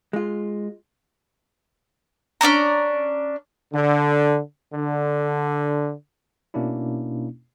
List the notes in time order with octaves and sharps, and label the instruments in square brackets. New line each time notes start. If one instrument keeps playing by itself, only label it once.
[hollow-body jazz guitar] G#3 F4
[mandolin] C#4 D4 D5 A#5
[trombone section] D3
D3
[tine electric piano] B2 A#3 C#4 D4 E4